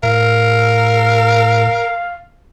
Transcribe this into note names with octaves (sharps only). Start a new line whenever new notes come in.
A2 A#4 F5